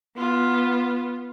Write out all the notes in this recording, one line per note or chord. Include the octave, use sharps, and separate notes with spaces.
B3 F4